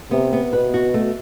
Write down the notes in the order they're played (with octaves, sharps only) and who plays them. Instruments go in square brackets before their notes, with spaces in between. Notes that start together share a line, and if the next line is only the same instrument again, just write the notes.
[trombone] C3 [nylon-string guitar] B3
[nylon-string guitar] B3
[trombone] B2 [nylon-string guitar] B4
[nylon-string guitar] F#4
A3